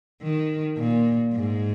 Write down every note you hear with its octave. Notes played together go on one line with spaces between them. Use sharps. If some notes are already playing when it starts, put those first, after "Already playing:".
D#3
A#2
G#2